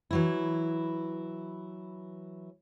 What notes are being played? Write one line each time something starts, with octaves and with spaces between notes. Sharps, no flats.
E3 F#3 E4